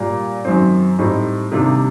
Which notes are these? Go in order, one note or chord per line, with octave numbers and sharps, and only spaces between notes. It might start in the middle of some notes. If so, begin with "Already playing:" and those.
Already playing: A#2 G3 A#3
F#2 D#3 F#3 C4
A2 G3 C4 D#4
C3 D#3 G3 A#3 D4